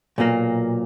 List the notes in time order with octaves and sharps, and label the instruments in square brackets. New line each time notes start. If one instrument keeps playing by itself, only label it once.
[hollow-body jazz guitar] B1 A#2 A#3